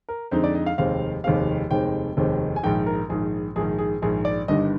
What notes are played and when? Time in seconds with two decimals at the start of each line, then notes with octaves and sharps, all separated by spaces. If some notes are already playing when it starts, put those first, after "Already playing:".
0.09 A#4
0.31 F2 D3 G#3 D#4 C5
0.44 D5
0.55 D#5
0.66 F5
0.78 F1 D#2 D#3 G#3 C4 F5
1.24 F1 D#2 D#3 G#3 C4 F5
1.71 F1 D#2 D#3 G#3 C4 G5
2.17 F1 D#2 D#3 G#3 C4
2.56 G#5
2.63 A#1 G#2 D#3 G5
2.86 A#4
3.09 A#1 G#2 D#3 G#4
3.56 A#1 G#2 D#3 G#4
3.79 G#4
4.02 A#1 G#2 D#3 G#4
4.25 D5
4.48 G1 G2 D#3 G3 D4 D#5